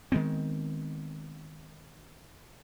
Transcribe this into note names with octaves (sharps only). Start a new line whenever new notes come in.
D#3 G#3 B3 C4